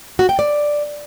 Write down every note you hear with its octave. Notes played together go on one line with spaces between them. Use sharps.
F#4
G5
D5